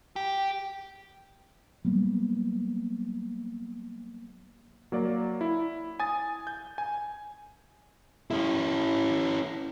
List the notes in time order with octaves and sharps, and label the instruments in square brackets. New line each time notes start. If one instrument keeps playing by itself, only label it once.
[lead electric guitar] G4
[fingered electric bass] F#3 G3 A#3 B3
[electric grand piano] F#3 A#3 D5
E4
G#5 D#6 A6
G6
G#5
[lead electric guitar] C#4 E4